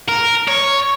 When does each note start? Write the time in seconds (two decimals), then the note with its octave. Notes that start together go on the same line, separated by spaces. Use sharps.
0.08 A#4
0.48 C#5